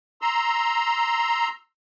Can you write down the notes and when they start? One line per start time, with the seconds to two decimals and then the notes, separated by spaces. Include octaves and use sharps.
0.22 A#5 C6 E6